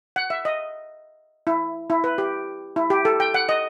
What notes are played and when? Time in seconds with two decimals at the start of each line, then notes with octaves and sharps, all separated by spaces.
0.16 F#5
0.30 E5
0.45 D#5
1.47 E4
1.90 E4
2.04 B4
2.18 G4
2.76 E4
2.90 G4
3.05 A4
3.20 G5
3.34 F#5
3.49 D#5